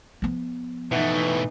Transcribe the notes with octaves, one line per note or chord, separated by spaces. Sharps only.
F3 B3
B2 E3 A3 D#4